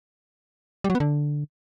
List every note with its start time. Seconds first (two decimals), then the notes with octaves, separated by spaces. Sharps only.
0.84 G3
0.90 F#3
0.95 B3
1.00 D3